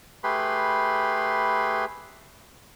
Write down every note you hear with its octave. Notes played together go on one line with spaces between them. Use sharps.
A3 G4 G#4 B4 B5 C6